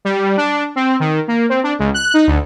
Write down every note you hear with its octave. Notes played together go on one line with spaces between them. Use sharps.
G3
D4
C4
D#3
A#3
C4
D4
C#2
F#6
D#4
D2